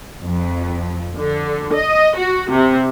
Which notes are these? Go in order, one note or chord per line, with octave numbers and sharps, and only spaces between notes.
F2
D3
D#5
F#4
C3